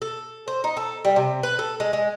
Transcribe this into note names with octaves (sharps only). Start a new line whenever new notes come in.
A4
C5
D#4
A4
G3
C3
B4
A4
G#3
G#3